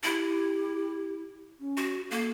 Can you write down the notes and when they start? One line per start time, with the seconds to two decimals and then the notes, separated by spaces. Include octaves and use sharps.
0.03 E4 G4
1.60 C#4
1.77 F#4
2.11 A#3 A4